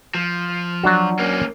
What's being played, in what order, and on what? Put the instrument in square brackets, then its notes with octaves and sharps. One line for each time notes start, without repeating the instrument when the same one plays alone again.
[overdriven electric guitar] F3
[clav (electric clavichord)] F#3 D4 F#4
[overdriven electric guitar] A#3 C#4